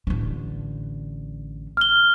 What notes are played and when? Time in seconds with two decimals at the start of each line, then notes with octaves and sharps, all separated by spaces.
0.07 A1 D3
1.77 F6 G7